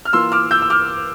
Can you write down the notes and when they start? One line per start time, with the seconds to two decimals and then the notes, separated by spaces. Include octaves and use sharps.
0.05 F6
0.13 E3 A#3 F4 C6 E6
0.32 D6 F6
0.51 E6 G6
0.62 E6
0.70 D6 F6